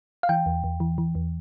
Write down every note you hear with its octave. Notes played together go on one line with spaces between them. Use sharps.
F5
E3 G5
E2
E2
E3
E3
E2